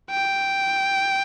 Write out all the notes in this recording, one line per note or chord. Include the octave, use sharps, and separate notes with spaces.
G5